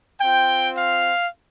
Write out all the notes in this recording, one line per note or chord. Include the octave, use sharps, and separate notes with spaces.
C4 F4 G5
F5